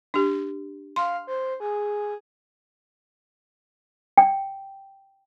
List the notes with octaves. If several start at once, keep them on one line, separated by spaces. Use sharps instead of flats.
D4 G4
F5 C6
C5
G#4
G5